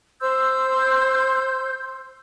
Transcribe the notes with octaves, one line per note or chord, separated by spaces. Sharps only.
C5 C6 E6 G6